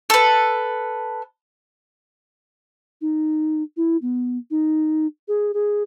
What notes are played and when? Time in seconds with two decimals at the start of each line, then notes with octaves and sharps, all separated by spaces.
0.10 A4 B4
3.01 D#4
3.77 E4
4.02 B3
4.51 D#4
5.28 G#4
5.54 G#4